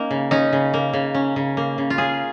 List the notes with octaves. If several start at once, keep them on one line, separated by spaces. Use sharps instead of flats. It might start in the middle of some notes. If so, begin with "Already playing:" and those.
Already playing: A#3 C#4 D#4
C#3
C#4 D#4
C#3
A#3
C#3
C#4
C#3
A#3
C#3
F4
C#4 G#4